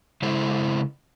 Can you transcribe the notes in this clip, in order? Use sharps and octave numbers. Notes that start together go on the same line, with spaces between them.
C#3 G#3 E4 A4 C5